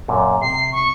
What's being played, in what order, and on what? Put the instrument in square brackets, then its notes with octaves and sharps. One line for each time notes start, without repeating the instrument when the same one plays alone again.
[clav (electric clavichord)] F#2 A#2
[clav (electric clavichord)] C3 [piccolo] C7
[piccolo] C#6